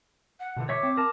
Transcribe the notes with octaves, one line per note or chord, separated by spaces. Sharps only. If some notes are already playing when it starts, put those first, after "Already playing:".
F#5
B2 D3 E3
C#5 E5 C#6 D6
C4
A#4 A5